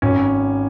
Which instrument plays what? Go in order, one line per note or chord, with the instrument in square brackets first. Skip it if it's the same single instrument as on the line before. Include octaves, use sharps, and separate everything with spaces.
[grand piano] G#1 C#4